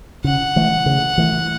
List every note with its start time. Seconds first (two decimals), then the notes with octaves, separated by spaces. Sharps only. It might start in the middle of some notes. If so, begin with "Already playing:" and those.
0.24 C#3 F#5
0.56 E3 A3
0.86 C#3
1.18 E3 A3